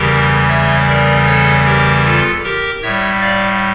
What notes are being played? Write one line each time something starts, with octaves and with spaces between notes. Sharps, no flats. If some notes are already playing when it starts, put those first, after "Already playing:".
Already playing: E2 C#3 E3 G3 G4 A#4
C#5 E5
A#4 D5
A4 C#5
G4 A#4
F4 A4
G4 A#4
A2 G3 C#5 E5
D5 F5